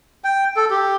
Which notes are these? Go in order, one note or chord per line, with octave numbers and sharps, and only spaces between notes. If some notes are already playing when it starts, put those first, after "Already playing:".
G5
A4
G4